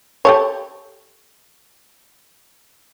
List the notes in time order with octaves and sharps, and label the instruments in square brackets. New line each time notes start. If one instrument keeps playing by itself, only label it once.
[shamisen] G4 A4 C#5